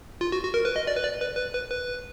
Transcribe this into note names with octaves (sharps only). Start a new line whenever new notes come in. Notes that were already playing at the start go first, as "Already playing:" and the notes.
F4
F#4
F#4
A#4
B4
D#5
D5
B4
D5
B4
B4
B4
B4